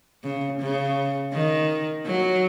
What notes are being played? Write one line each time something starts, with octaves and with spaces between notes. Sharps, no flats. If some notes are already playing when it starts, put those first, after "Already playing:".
C#3
C#3
D#3
F#3